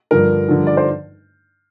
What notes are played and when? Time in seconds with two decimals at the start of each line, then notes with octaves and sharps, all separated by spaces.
0.11 G2 D3 F3 A#4
0.48 G2 D3 F3
0.67 D5
0.77 C5